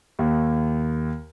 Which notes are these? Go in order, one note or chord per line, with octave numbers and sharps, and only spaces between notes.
D#2